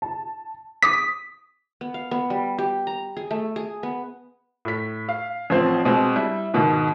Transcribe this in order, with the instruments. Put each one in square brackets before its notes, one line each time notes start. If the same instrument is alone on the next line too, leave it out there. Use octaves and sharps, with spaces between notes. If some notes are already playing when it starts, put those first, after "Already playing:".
[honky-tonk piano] A5
[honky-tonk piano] D6 D#6 [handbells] B6
[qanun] B3
F5
B3
G3
G4
A#5
G#4
A3
G#4
B3
[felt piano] A2 B6
F5
A1 F3 C4 C5
B2 G#3 C4
G3 E4
G#2 B2 D#3